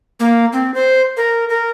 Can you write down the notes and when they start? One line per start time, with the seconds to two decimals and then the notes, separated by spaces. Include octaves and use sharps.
0.20 A#3
0.53 C4
0.74 C5
1.17 A#4
1.49 A#4